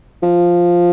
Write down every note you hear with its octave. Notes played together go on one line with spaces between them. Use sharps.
F3